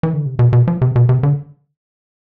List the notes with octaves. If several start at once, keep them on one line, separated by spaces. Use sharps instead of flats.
E3
D3
C3
B2
B2
F3
C3
B2
C3
D3